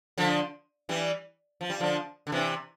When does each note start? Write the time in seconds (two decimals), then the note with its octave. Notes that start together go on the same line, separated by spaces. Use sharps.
0.18 D3 F3
0.89 E3 G3
1.61 F3
1.70 G3
1.80 D3 F3
2.27 D3
2.32 C3 E3